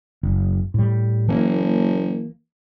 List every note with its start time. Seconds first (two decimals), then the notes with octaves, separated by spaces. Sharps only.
0.23 F#1
0.74 A2 G3
1.28 F#1 E3 A#3